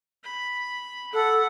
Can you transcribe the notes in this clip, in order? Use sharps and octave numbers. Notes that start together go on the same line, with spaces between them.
B5
A4 F#5